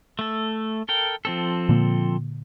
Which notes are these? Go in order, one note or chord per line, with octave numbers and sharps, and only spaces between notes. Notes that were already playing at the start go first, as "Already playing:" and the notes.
A3 A4
A4 A#4 G5
F3 C4 A4
A#2 D3 A#3